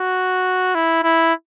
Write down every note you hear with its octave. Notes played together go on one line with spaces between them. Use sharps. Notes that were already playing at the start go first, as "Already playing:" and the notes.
Already playing: F#4
E4
E4